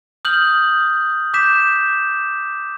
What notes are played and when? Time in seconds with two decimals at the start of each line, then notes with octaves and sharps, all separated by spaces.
0.25 D#6 F6 G6 F#7
1.34 D6 G6 B6 E7